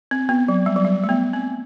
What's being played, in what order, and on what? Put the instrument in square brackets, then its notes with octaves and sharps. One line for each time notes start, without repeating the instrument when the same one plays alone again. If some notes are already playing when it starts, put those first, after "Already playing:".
[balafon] C4
B3
F#3
G3
F#3
G3
A3
B3
C4